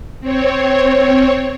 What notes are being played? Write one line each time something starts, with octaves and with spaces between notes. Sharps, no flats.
C4 C#5